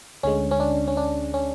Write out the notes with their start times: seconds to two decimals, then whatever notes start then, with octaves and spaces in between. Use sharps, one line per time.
0.23 D2 D3 G#3 C#4
0.51 C#4
0.60 D4
0.88 C#4
0.97 D4
1.34 C#4